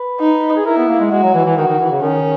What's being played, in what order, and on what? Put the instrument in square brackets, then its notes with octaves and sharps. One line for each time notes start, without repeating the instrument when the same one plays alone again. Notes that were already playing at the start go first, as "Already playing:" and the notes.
Already playing: [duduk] B4
[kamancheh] D#4
[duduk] G#4
[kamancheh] E4 [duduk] A#4
[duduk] B3
A#3
G#3
[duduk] G#3 [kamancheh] F#4
[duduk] F#3
E3
E3
[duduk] D#3 [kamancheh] F#4
[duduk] D#3
E3
C#3
[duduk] D#3 [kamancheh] C#4